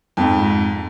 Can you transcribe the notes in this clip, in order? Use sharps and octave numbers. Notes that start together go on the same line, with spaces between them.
F2 G#2